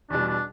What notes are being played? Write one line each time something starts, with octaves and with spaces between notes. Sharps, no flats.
E2 B2 G3 D4
D4